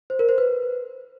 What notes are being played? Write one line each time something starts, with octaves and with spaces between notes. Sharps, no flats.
C5
A#4
C5
B4